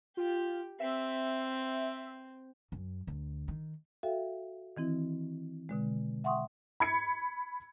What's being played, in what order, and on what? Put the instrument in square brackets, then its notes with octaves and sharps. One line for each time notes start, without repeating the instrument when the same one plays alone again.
[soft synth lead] F4 [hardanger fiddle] G4
[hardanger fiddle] C4 [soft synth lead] E5
[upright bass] F#2
D2
D#3
[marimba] F#4 A4 E5 F5 G5
D#3 E3 C4 E4
B2 D3 G#3
E5 F#5 G5 C6 C#6 D#6
[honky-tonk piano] B5 G#6 C#7